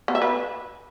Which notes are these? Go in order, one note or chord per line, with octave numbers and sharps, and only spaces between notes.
B3
E5
B4